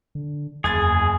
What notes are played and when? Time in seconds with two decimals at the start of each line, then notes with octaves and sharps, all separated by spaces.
0.15 D3
0.64 F#1 E2 G#4 G#6 A6